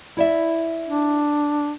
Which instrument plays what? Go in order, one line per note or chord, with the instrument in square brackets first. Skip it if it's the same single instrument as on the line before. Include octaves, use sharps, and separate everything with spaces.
[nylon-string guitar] E4 D5 E5
[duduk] D4